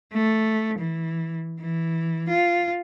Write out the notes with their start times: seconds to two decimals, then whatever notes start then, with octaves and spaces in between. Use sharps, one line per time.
0.13 A3
0.79 E3
1.60 E3
2.29 F4